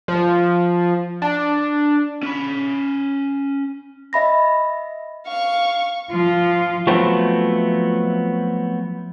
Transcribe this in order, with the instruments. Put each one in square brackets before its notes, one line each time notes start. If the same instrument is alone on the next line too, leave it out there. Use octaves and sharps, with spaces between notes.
[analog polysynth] F3
D4
[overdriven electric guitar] C#4 B5
[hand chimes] D#5 E5 B5 A#6
[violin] F5 C#6
[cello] F3 F4
[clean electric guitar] F3 F#3 A3 B3 C4